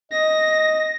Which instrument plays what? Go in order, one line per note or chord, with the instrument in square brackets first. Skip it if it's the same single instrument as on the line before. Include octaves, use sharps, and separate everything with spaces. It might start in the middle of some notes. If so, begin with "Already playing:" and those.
[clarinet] D#5 [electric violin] A#6